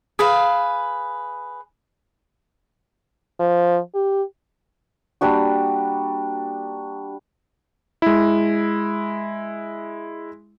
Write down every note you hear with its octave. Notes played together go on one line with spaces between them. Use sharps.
G#4 B4 F5
F3
G4
G3 A#3 D4 F#4
G#3 E4